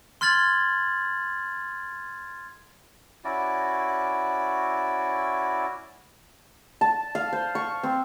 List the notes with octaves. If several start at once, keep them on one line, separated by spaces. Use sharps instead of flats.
C6 F6 G#6 A6 F#7
C#4 E4 F#4 D5
A5
F5
C5
C#6
C4